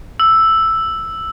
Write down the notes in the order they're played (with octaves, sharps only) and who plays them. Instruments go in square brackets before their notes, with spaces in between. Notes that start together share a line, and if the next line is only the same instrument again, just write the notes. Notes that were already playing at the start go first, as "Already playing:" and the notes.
[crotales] E6